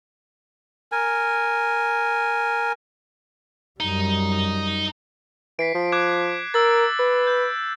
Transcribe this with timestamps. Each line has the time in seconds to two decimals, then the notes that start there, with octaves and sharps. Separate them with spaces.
0.92 A#4 G#5
3.80 F#2 G3 D#4
5.59 E3 B6 C7 D7
5.75 F3
5.92 D6 F#6 G#6
6.54 A#4 E6 A6
6.99 B4
7.27 G6